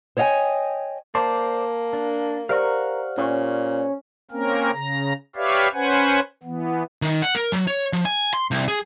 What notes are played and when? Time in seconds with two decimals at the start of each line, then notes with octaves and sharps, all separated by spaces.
0.17 C5 C#5 D#5 F5 G5 G#5
1.15 A#3 C5 D5 A5
1.93 D4
2.49 G4 A#4 C5 D5 F5 F#5 C#6
3.18 A#2 C#4
4.31 A#3 C4 C#4 A#4
4.72 C#3 A#5
5.36 G4 B4 C#5 D5 E5 F5
5.74 C#4 B4 C5 F#5 G#5
6.43 E3 B3
7.02 D#3
7.22 F#5
7.35 A#4
7.52 F#3
7.67 C#5
7.93 F3
8.05 G#5
8.34 C6
8.51 C2
8.68 G#4